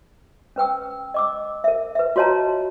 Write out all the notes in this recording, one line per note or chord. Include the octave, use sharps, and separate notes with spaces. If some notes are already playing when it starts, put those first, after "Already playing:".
C#4 B4 G5 E6
D#5 D6 E6
A#4 E5
B4 E5
F4 F#4 C#5 D#5 A5 A#5